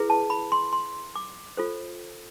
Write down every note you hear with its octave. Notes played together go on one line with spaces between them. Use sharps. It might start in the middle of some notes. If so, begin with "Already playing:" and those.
Already playing: E4 G#4 B4
A5
B5
C6
C6
D6
F4 A4 C5